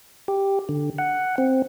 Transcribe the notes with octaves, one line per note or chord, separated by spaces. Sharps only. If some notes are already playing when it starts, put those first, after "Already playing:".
G4
D3
F#5
C4